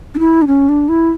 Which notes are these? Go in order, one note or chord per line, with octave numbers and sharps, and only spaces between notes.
D4
E4
D4
C#4
D4
E4